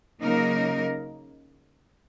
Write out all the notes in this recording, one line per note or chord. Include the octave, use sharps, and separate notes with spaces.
C#3 F#3 A#3 D#4 A#4